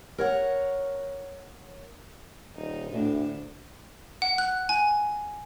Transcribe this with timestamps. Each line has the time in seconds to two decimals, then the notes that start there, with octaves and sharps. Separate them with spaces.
0.18 A#4 C#5 F#5
2.56 D#1 D#4
2.91 D2 A2 D3 D4
4.22 F#5
4.38 F#6
4.69 G#5